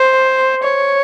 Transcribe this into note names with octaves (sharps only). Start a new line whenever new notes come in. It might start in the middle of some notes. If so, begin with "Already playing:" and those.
Already playing: C5
C#5